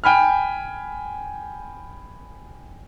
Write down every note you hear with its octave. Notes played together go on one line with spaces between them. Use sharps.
G5 G#5 B5 F6